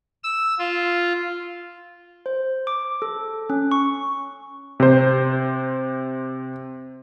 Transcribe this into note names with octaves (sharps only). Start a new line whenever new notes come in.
E6
F4
C5
D6
A4
C#4
C#6
C3 C5